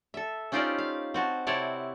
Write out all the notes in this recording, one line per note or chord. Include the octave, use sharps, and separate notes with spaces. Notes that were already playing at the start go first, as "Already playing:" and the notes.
A4 E5
C#4 D#4 F4 G4 C5 D5
F5
C4 F#4 A5
C3 C4 E4 C#5 D5 A5